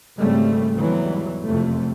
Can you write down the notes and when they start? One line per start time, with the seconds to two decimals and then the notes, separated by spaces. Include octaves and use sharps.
0.18 G#1 C#3 G3 A3 C4
0.76 E2 G#2 E3 F#3 G3
1.44 F#1 F2 C3 A3